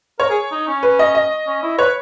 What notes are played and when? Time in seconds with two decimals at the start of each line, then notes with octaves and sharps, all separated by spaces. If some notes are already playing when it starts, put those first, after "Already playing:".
0.19 A#4 C#5
0.30 G#4
0.52 D#4
0.68 C#4
0.83 B4
0.99 D#5
1.15 D#5
1.47 C#4
1.63 E4
1.78 B4 C#5